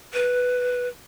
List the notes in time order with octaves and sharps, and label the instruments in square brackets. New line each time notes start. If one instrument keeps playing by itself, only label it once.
[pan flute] B4